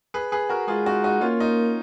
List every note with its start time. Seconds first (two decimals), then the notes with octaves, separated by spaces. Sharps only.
0.14 G#4 B4
0.32 G#4 B4
0.49 F#4 A#4
0.68 G#3 F4 G#4
0.86 D#4 F#4
1.04 D#4 F#4
1.21 A#3 C#4 F4
1.40 D#4